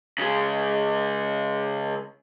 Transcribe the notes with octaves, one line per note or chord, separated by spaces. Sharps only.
C#3 G#3